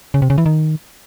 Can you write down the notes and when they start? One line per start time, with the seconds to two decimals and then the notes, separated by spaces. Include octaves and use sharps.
0.14 C#3
0.22 C3
0.30 C#3
0.38 E3
0.46 D#3